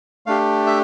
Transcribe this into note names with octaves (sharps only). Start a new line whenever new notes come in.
A3 D4 G4 F5
E5